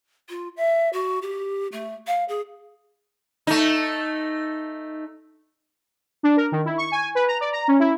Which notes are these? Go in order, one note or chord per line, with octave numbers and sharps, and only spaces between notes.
F4
E5
F#4
G4
A3
F5
G#4
A3 D#4
D4
A#4
D#3
E4
C#6
G#5
B4
A#5
D5
A#5
C#4
E4